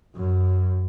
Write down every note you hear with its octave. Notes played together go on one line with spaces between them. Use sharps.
F#2